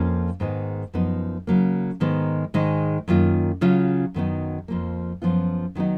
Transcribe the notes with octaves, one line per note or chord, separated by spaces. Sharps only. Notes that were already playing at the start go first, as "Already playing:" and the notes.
Already playing: F2 F3 A#3 C#4 F4
G#2 D#3 G#3 B3
F#2 F3 B3 D#4
C#3 F#3 A#3
G#2 D#3 G#3 B3
G#2 D#3 G#3 D#4
F#2 D#3 A#3 F4
C#3 F#3 C#4 F4
F#2 D#3 F#3 B3 D#4
F2 F3 A#3
F#2 F3 B3 F4
D#3 F#3 B3 D#4